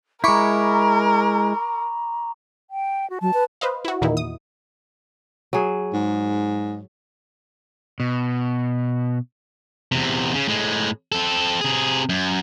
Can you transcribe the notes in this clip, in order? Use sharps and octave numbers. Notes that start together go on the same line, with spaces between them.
G#3 E4 A#4 A#5 B5 C#6 D6
G5
F#4
F#3 A5
B4
B4 C5 D#5 F5
E4 F#4
E2 A#2 D#3 D#4 E4
D#6
F#3 G#4
G#2
B2
E2 C3
C#3
A2 G#3
C4 A4
C3 G#4
F#2